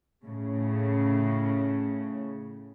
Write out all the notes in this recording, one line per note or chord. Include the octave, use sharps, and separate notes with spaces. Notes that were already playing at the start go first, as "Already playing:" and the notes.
A2 C#3